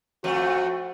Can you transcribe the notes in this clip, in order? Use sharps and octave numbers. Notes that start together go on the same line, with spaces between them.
F2 A3 F#4